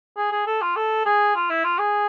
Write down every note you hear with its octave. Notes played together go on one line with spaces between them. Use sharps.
G#4
G#4
A4
F4
A4
G#4
F4
E4
F4
G#4